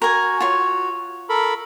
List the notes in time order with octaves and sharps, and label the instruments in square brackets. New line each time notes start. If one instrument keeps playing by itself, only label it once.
[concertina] F#4 [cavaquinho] A#4 G#5
[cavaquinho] F4 C#5
[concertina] A4 A#4 B5